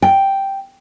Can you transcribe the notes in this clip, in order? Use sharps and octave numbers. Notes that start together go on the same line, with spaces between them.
G5